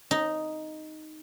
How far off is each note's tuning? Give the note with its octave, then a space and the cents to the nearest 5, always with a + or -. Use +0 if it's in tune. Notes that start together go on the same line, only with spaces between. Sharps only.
D#4 +0